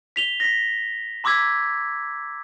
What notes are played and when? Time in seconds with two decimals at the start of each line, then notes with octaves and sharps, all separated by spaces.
0.16 B6 F7 G7
0.40 A#6 B6
1.24 A#5 C6 D6 E6 G#6 B6